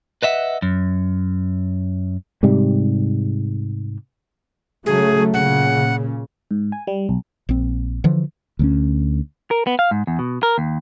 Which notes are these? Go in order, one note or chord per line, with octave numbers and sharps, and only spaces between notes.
B4 D#5 E5 F#5
F#2
G#2 C3 G3
C#3 F#3 A3 G#4
A#2 C#3 F#5
G#2
G#5
G3
B1
A#1 C4
D3 E3 F3
D2 G#3 C#4
A#4
B3
F5
G#2
E2
B2
A#4
D#2